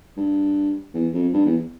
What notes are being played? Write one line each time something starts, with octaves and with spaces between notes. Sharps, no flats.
G2
E2
F2
G2
E2